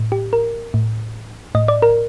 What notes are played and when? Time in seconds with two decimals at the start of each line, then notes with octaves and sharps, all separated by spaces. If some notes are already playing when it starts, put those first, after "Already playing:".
Already playing: A2
0.12 G4
0.33 A#4
0.74 A2
1.55 A2 D#5
1.68 D5
1.82 A#4